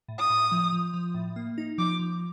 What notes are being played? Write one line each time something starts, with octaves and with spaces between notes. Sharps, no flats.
A2
D#6
A2
F3
F3
F3
A2
A#3
D#4
F3 D6
F3